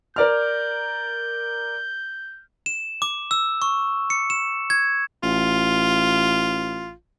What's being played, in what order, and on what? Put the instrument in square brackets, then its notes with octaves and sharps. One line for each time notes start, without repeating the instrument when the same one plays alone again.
[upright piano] A#4 D5 F6 [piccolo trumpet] G6
[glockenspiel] E7
D6
E6
C#6
C#7
E7
G#6
[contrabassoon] A1 [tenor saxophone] F4